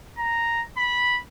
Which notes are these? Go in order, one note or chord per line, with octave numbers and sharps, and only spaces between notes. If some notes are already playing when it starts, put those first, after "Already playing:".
A#5
B5